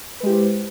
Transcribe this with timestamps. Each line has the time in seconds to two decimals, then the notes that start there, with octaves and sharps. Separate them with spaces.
0.20 B4
0.23 G#3
0.26 G4
0.29 E4
0.32 C5